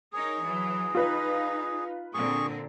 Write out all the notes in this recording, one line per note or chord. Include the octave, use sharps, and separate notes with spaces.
D#4 G#4 A#4 C#5
E3 F#3
D#4 F4 B4
A#2 D3 C4 G#4 C#6